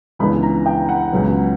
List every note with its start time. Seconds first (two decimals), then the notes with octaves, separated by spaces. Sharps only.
0.19 C#2 C#3 E3 B3 D4 B5
0.43 A#5
0.66 G5
0.89 F#5
1.11 C#2 C#3 F#3 B3